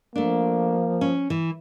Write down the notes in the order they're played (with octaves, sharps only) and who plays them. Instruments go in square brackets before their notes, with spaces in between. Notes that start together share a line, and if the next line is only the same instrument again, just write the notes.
[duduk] F3 [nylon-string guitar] A3 D4 [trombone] A#3
[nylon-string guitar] C#4
E3